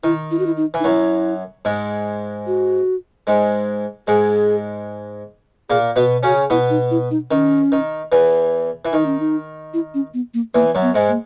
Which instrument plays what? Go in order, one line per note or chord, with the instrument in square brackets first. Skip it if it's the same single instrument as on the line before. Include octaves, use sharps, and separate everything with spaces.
[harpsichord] D#3 [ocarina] E4
[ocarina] E4
F#4
E4
D#4
[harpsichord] E3
[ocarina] D#4
[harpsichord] F#2 F#3 [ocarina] E4
[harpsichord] G#2 G#3
[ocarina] F#4
[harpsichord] G#2 G#3
[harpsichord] G#2 G#3 [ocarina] G#4
[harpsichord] A#2 A#3 [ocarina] G#4
[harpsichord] B2 B3 [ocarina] F#4
[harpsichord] C#3 C#4 [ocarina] F#4
[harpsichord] B2 B3 [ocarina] E4
[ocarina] D#4
E4
D#4
[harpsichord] D#3 [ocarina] C#4
[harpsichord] D#3
E2 E3
E3
[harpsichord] D#3 [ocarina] D#4
[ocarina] C#4
D#4
E4
C#4
B3
A#3
[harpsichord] E2 E3 [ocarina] A#3
[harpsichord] F#2 F#3
[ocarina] B3
[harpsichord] G#2 G#3
[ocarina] A#3